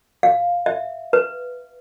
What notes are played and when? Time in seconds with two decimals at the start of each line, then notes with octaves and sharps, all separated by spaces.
0.23 F5
0.66 E5
1.13 B4